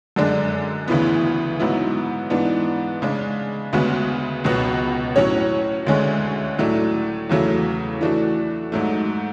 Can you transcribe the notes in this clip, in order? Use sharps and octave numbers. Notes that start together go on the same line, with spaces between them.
F#2 D3 G#3 D4
D2 C#3 E3 B3
G#2 F#3 B3 E4
G#2 E3 B3 D4
C#3 G#3 D4
D2 C#3 G#3 B3 F#4
C#2 B2 F#3 B3 F#4
A2 F#3 C#4 F#4 C#5
D2 D3 G#3 C#4
A2 F#3 A3 D4
E2 C#3 F#3 A3
E3 A3 D4 F#4
G#2 F#3 A3